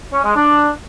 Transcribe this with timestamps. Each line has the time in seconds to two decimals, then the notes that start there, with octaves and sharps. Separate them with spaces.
0.12 C#4
0.24 G#3
0.35 D4